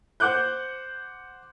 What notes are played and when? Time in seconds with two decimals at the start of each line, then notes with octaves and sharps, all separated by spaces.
0.20 C5 F#5 D6 F#6 G6